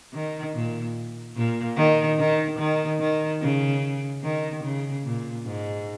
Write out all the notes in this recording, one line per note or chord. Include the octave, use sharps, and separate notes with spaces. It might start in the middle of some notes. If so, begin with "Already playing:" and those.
D#3
A#2
A#2
D#3
D#3
D#3
D#3
C#3
D#3
C#3
A#2
G#2